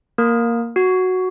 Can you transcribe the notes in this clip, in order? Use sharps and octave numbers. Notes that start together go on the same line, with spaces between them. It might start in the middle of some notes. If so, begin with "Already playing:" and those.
A#3 A#4
F#4